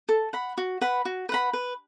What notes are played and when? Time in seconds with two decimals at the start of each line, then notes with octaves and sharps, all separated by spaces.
0.09 A4
0.33 F#5 B5
0.58 F#4
0.81 B4 F#5 B5
1.05 F#4
1.29 B4 F#5 B5
1.53 B4